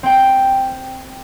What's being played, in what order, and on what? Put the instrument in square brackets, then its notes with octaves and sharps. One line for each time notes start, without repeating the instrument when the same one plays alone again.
[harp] C4 G5